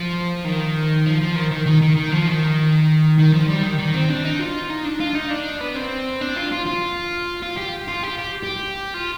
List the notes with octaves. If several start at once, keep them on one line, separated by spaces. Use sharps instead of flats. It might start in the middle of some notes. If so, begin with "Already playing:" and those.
Already playing: F3
D#3
F3
F3
D#3
D#3
D#3
D#3
D#3
F3
D#3
D#3
F3
G3
D#3
D#3
C4
D4
D#4
F4
D#4
D4
F4
D#4
D4
B3
C4
D4
F4
F4
F4
F4
G4
F4
G4
G4
G4
F4